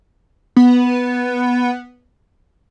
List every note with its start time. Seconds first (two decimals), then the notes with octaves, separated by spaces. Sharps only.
0.56 B3